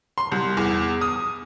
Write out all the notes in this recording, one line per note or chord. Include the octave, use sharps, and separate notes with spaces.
C6
C2
E2
D#6